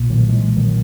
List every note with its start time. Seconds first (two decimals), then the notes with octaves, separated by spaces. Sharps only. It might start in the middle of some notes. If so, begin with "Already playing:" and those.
Already playing: B1 A#2
0.10 D#3 F#3
0.28 E3 G#3
0.57 D#3 F#3